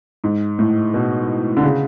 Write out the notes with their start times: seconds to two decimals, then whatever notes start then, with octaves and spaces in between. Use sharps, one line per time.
0.24 G#2
0.59 A2
0.94 B2
1.57 D3
1.63 C#3